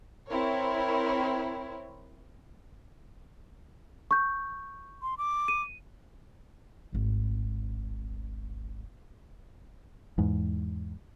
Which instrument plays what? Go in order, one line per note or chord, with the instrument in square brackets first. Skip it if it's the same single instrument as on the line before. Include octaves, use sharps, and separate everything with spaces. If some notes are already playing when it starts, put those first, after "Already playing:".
[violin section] C4 E4 A#4 C#5
[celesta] C#6 G6
[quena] C6
D6
[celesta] D#7
[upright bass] D1 G#1
[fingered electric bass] E2 G#2